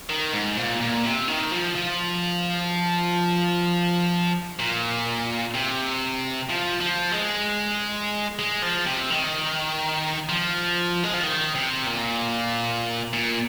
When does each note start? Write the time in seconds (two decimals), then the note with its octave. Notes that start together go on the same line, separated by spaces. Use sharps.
0.09 D#3
0.33 G#2
0.57 A#2
0.80 A#2
1.04 C3
1.28 D#3
1.51 F3
1.75 F3
4.59 A#2
5.55 C3
6.50 F3
6.81 F3
7.12 G#3
8.39 G#3
8.63 F3
8.86 C3
9.10 D#3
10.29 F3
11.03 G#3
11.13 F3
11.23 D#3
11.55 C3
11.87 A#2
13.13 A#2